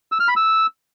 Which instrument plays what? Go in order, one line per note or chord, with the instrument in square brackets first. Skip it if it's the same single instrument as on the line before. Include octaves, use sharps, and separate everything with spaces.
[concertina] E6
F6
B5
E6